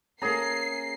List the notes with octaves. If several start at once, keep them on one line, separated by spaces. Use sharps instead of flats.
A#3 C#4 G#4 A#5 C7